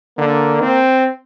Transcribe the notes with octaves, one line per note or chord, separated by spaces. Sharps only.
D3 A#3
C4